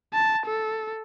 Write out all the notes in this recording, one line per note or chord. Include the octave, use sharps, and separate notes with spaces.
A5
A4